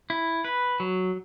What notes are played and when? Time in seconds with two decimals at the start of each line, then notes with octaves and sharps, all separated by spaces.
0.10 E4
0.45 B4
0.80 F#3